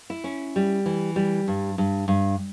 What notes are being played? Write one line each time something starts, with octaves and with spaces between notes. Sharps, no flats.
E4
C#4
G3
E3
G3
G2
G2
G2